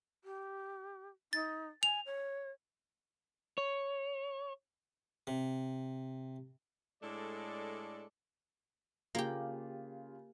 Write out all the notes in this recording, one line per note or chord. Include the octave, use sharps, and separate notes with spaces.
G4
D#4 A6
G#5 F7
C#5
C#5
C3
A2 G#3 D4 A4 D5
C#3 A#3 F4 G4